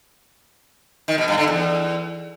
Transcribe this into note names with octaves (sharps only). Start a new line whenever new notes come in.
D#3
B2
G2
D3
E2